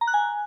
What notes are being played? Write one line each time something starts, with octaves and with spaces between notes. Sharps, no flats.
A#5
F#6
G#5